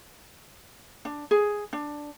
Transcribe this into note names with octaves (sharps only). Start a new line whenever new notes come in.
D4
G#4
D4